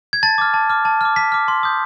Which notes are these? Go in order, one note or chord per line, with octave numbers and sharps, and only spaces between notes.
G#6
A5 A6
D6 F6
A5
D6 F6
A5
D6 F6
A5 B6
D6 F6
C6
D#6 G6